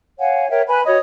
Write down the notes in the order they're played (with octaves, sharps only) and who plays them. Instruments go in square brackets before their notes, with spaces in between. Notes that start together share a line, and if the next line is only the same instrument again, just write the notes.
[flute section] C#5 F5 F#5 G#5
A#4 C#5 E5 G5
B4 G#5 B5 F#6
F#4 C#5 D#5 D#6